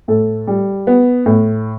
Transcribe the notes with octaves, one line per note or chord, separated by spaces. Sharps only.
A2 A4
G3
B3
A2